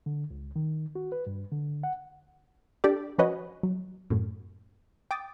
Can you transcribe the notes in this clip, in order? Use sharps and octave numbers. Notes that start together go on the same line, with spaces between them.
D3
C#2
D#3
F#4
B4
G2
D3
F#5
D4 G4 A4 D5
F3 C#4 F#4 B4 C#5 D#5
F#3
F#2 A2
G5 D6 D#6 A6